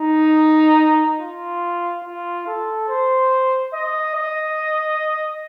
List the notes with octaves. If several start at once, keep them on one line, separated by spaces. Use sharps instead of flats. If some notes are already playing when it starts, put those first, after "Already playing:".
Already playing: D#4
F4
F4
A4
C5
D#5
D#5